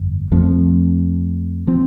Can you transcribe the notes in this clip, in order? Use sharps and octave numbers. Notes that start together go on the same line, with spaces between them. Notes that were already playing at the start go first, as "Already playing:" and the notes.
Already playing: G1 F2
F2 F3 A3 C4
F3 C4